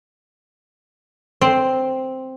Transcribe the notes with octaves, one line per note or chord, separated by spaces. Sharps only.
C4